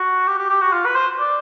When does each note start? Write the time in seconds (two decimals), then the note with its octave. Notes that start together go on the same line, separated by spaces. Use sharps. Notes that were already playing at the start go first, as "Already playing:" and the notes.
Already playing: F#4
0.27 G4
0.39 G4
0.50 G4
0.61 F#4
0.73 F4
0.85 B4
0.96 C5
1.20 D5